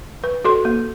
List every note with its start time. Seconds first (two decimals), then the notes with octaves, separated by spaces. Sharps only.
0.24 B4
0.45 F#4 A4 C6
0.65 A#3